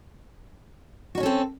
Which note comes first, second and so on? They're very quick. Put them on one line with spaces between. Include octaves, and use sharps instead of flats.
F#4 D#4 C#4 A4 C4